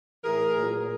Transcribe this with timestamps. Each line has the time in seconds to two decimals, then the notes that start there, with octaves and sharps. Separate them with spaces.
0.22 A2 E3 G#4 A#4
0.56 A#2 F#3